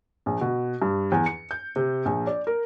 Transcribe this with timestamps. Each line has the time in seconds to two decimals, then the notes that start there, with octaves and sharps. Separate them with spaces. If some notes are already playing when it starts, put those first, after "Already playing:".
0.26 A#1
0.41 B2
0.82 G2
1.12 E2
1.26 C#7
1.51 G6
1.76 C3
2.05 A#1
2.27 D5
2.47 A#4